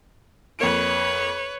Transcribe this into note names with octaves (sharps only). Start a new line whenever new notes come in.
F2 A#3 B4 C#5 D7